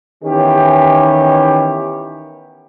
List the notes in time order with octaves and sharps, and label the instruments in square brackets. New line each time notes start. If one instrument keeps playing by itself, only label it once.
[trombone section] D#3 E3 B3 C#4 G4